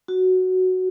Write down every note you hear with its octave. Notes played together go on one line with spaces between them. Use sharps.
F#4